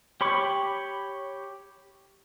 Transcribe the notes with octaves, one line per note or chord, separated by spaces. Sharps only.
G4 C#5 B5 C#6 D6